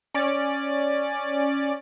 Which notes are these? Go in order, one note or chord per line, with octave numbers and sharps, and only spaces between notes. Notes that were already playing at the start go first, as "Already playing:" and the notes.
C#4 D5